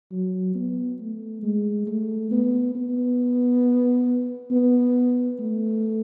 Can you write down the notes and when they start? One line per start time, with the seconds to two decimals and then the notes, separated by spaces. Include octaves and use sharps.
0.11 F#3
0.55 B3
1.00 A3
1.43 G#3
1.87 A3
2.31 B3
2.75 B3
4.51 B3
5.39 A3